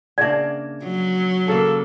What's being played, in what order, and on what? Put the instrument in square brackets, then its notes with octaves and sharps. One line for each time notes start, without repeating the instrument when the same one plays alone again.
[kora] C#3 A#3 D4 [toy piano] D5 E5
[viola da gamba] F#3
[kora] C#3 A#3 [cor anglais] A4